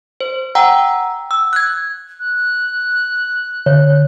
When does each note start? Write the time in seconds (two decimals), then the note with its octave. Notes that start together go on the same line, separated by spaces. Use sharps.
0.21 C5
0.55 F#5 G5 A#5 E6
1.31 E6
1.53 F#6 G#6
2.20 F#6
3.66 D3 C#5